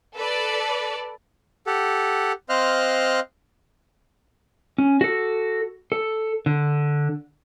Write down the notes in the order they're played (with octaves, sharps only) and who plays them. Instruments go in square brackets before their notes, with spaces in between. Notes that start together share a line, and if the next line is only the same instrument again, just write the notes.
[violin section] A4 B4 D5
[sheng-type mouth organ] G4 A4 F#5
C4 C5 D#5 F5 F6 F#6
[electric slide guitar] C#4
F#4 A4
A4
D3